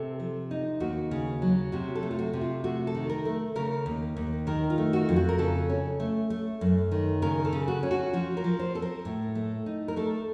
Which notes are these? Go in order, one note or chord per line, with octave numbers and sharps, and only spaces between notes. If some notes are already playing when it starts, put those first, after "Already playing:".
Already playing: C3 A4
F3
D#4
D#2 F#4
C#3
F#3
C3 F#4
A4
A3
F4
F#4
C3
F4
A3 F#4
A4
D#3
A#4
A3
C#3 A#4
D#2
D#2
D#3 A#4
F4
A3
F#4
F2
F#4
A#4
C#3 A4
C#4
A3
A3
F#2
D#3
C#3 A#4
A4
C#3
F#4
C#4
F#4
F3 F#4
A#4
F3
C5
C4 A4
A#4
A2
A3
D#4
A#4
A3 A4